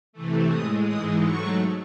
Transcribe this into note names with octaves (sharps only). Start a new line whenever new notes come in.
C3 E3 A3
A2 G#3 D#6
G#2 E3 G#3 D#6
G#2 F#3 A3 C#6